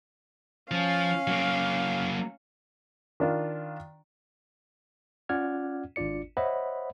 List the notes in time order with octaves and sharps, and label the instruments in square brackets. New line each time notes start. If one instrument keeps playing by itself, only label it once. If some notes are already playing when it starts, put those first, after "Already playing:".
[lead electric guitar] F3 [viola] C#4 F5
[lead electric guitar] F#3 A#3
[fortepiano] D#3 D4 F4
[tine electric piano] C#4 F4 D5 F#5 F6 G#6
G#1 D4 F4 D5 C#7
C5 C#5 D#5 E5 F#5 B5